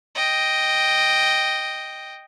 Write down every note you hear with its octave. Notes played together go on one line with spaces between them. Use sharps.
D#5 G5